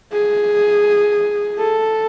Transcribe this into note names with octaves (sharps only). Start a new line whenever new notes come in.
G#4
A4